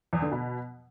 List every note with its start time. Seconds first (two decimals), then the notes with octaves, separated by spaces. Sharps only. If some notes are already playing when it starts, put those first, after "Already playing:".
0.13 E2
0.22 D3
0.32 B2